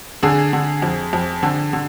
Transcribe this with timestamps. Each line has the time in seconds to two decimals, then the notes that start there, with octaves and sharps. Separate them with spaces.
0.23 D3 G#4
0.53 D3
0.82 F2
1.13 F2
1.43 D3
1.73 D3